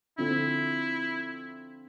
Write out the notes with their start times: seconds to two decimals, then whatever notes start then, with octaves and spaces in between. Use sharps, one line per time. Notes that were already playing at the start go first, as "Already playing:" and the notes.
0.18 D3 F3 C4 E4